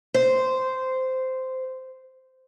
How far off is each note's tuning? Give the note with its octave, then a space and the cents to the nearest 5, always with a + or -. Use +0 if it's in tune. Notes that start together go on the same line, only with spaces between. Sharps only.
C5 -10